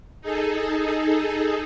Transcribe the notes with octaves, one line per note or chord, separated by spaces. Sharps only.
D#4 G#4 A4